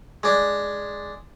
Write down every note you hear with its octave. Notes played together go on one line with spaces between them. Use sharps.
G#3 D4